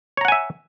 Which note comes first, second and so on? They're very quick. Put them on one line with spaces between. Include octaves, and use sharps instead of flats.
C#5 A#5 F#5 G#5 E5